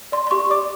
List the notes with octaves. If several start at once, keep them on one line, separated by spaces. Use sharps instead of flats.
D5 C6
C6
G4 C#6
D5 D6